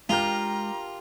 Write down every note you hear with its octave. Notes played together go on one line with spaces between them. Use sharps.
G#3 D4 F4 G4 A#4 G5 A#5